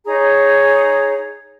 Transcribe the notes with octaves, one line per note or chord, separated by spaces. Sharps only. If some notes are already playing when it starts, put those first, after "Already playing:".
D#4 G#4 C#5 A#5